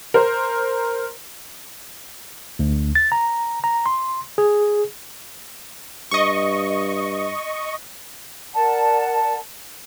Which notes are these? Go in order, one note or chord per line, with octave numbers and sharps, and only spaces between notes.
A#4 C5
D2
A6
A#5
A#5
C6
G#4
G2 D#5 C#6
A#4 D5 F#5 A5